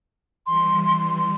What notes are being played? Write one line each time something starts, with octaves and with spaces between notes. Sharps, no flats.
E3 G3 C6